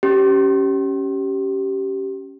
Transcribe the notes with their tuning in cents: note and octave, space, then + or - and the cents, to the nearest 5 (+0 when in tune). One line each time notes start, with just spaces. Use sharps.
C#4 +0 G4 -20